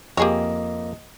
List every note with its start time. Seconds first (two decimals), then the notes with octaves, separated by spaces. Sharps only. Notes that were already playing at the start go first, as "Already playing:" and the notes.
0.17 F2 A#3 G4 G#4 C#5 D#5